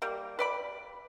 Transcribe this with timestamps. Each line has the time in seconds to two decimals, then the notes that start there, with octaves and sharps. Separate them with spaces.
0.02 G3 A#3
0.39 B4 D5 B5